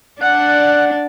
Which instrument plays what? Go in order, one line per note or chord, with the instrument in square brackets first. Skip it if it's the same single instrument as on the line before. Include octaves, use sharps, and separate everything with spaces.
[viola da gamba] D4 D5 [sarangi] F#5 [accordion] F#6